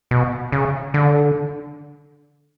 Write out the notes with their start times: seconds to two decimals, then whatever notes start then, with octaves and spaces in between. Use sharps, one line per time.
0.11 B2
0.52 C#3
0.94 D3